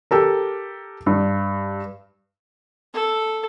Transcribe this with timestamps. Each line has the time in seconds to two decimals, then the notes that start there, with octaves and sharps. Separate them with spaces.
0.11 G4 A4 A#4
1.06 G2
2.93 A4